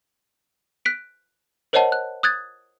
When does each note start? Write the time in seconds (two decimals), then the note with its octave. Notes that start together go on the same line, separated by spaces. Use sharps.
0.85 F#6 B6 D7
1.73 A#4 C5 C#5 D#5 F#5 A5
1.92 F#6
2.23 D#6 F#6 G#6 A6